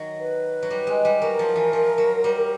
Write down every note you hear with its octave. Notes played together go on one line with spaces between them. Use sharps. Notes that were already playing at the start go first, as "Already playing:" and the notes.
Already playing: D#3 F#3
B4
F#3
G3
G#3
G3
F#3 A#4
F3
E3
F3
F#3
G3